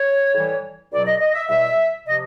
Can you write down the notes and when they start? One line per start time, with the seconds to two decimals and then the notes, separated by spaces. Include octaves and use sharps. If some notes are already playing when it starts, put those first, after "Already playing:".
Already playing: C#5
0.33 A2 E3 G3
0.91 C#2 B2 F#3 D5
1.06 D#5
1.20 D#5
1.34 E5
1.48 E2 B2 G3 E5
2.06 C3 F3 D#5